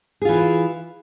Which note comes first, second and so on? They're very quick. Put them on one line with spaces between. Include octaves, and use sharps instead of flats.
G#4 F4 E3